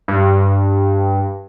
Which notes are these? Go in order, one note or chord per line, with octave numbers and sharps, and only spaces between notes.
G2